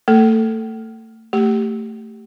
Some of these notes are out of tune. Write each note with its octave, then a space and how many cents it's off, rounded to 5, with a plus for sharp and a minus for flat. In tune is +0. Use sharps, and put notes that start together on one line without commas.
A3 +35 A4 +0
A3 +20 G4 +0